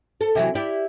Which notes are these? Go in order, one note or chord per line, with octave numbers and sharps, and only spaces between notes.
A4
C3 E3 F#3
E4 G4 D5